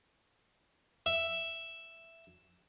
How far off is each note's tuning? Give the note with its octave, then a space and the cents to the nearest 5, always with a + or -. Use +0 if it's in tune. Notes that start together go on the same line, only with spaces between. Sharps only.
E5 +5